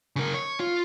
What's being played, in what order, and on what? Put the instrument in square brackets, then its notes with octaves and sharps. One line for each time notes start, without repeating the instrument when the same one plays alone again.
[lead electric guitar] C#3 A#4
C#5
F4